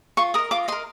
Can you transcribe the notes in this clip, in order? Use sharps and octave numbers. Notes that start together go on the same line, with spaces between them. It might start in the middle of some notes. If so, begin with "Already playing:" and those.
F4 C#6
A#4 D#5 D#6
F4 D6
A#4 D#5 C6